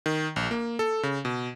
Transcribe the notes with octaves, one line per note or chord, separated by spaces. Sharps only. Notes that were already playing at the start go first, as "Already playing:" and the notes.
D#3
A#1
A#3
A4
C#3
B2